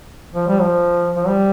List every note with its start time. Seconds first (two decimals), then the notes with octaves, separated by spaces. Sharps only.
0.35 F3
0.48 G3
0.61 F3
1.16 F3
1.27 G3